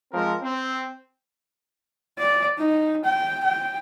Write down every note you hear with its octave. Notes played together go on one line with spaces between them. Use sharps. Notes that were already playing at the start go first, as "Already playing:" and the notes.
F3 G#3 C4 A#4
C4
D5
D#4
G5
G5